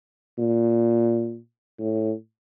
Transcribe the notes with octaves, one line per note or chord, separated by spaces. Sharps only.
A#2
A2